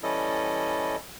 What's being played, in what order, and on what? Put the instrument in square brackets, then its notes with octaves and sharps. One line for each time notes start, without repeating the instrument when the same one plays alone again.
[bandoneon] E3 G3 C#4 E4 A4 D#5